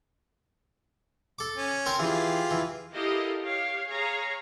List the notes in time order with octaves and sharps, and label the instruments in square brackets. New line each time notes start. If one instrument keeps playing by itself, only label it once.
[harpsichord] A4 D6
[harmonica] C#4
[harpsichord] C4 A#4 C5
[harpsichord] E3 [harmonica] F4 G4 G#4
[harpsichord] E3
[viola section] E4 G4 A4 A#4 D#5 F5
G4 C#5 F5
G#4 C#5 F5 A#5